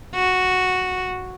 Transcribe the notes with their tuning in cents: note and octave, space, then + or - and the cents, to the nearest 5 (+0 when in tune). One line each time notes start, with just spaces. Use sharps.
F#4 -5